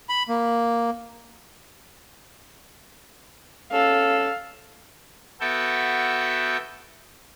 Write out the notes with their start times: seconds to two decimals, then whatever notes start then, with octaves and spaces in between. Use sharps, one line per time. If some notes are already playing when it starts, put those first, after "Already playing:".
0.09 B5
0.29 A#3
3.72 C#4 A4 F5
5.41 B3 F#4 A4 E5 G5